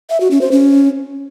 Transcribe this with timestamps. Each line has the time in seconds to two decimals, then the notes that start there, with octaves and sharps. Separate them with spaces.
0.10 E5
0.20 F#4
0.31 C#4
0.41 C5
0.52 C#4